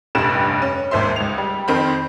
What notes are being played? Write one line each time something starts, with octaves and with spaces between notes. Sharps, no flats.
F1 A#1 G2 G3 F#6 E7
C#4
G#1 D#2 C5 E5 C6
C#2 F7
G3
F2 D#3 C4 C5 B5